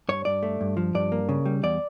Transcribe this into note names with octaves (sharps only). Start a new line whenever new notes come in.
G2 C#5
G2 D5
A3
G2
F3
G2 D5
A#3
C#3
G3
E2 D5